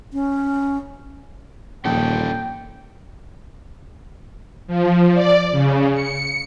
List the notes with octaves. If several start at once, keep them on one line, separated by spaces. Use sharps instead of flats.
C#4
D#1 A#1 C#4 A4 G5
F3
D5
C#3
C#7